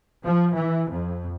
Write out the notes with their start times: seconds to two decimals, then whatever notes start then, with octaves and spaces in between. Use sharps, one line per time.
0.24 F3
0.54 E3
0.89 F2